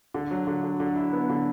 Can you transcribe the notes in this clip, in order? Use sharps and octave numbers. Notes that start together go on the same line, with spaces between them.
D3
F#3
D3
D3
D3
E4
B3
D3